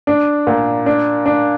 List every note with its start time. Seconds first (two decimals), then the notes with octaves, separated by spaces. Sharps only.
0.07 D4
0.47 A#2
0.86 D4
1.26 D4